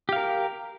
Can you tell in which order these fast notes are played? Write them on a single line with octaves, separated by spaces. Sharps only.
G4 F5 A#4